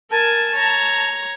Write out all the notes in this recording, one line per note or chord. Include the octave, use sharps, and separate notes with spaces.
A#4 G#5 A5
C#5 A#5